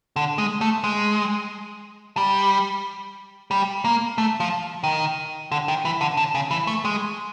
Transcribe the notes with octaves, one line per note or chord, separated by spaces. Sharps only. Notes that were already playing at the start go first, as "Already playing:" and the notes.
D3
G#3
A3
G#3
G3
G3
A#3
A3
F3
D#3
D3
D#3
E3
D3
D3
C#3
E3
A3
G#3